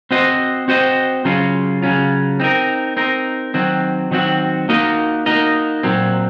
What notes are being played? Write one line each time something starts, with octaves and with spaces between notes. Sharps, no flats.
C4 F#4 C5 D#5
C4 F#4 C5 D#5
C#3 F#3 C#4 F4
C#3 F#3 C#4 F4
C4 D#4 A#4
C4 D#4 A#4
D#3 F#3 C4 F#4
D#3 F#3 C4 F#4
A#3 D#4 F#4 A#4 D#5
A#3 D#4 F#4 A#4 D#5
A#2 F#3 C4